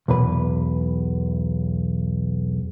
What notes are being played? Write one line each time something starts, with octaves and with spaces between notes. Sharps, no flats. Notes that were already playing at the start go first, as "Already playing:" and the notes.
B1 E2 B4